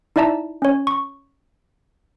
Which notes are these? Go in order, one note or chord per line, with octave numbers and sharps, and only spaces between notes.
D#4 E4 D5 E5 A5 A#5
C#4 C#5
C#6